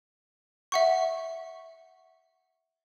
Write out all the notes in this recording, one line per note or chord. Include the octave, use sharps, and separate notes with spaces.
E5 F#5 C#6